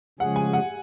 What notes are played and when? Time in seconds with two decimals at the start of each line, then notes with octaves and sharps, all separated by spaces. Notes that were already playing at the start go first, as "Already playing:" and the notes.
0.19 C#3 F3 G#3 C#4 G#4 F#5
0.36 G#5
0.53 F#5